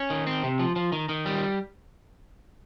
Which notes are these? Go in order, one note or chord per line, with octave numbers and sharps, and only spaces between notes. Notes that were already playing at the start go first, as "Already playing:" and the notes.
Already playing: C#4
D#3
C4
C3
F3
F3
D#3
D#3
G3